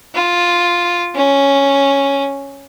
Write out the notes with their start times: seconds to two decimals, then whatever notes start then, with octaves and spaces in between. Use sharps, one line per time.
0.15 F4
1.15 C#4